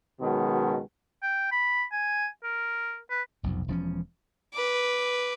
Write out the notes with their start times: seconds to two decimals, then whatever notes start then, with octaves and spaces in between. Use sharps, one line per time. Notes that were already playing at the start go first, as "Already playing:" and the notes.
0.21 C#2 B2 D#3 F#3 G#3
1.23 G5
1.52 B5
1.92 G#5
2.43 A#4
3.10 B4
3.43 F1 B1 F2
3.68 E1 F3 C4 C#4
4.54 B4 D6